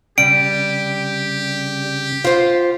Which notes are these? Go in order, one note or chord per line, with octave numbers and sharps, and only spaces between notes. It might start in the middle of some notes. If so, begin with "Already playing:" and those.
C#3 G3 G4 D7
F4 C5